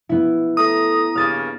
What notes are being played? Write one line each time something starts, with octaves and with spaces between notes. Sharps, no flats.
B3 E4
A3 A#5 D#6
G2 C#3 A#3 F6 A6 D#7